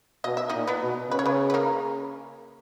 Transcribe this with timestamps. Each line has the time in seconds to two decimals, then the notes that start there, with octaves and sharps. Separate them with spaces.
0.24 B2 D#5
0.37 E5
0.49 A#2 D#4 D#5
0.67 B3 B4
0.82 B2
1.10 C#3 B4
1.19 C#5
1.26 B3 B4
1.50 B4
1.54 A#3 A#4